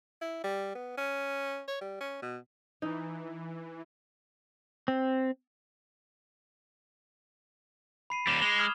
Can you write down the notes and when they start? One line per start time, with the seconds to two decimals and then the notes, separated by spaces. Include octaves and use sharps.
0.21 E4
0.44 G3
0.75 B3
0.97 C#4
1.68 C#5
1.81 G3
2.00 C#4
2.22 B2
2.82 E3 D#4
4.88 C4
8.10 B5 C7 D#7
8.27 D#2 G3 D6 E7 F#7
8.42 G#3 F7 G7
8.58 D#6 F6 G#6